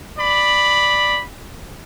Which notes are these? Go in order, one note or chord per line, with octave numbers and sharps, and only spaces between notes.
D5 B5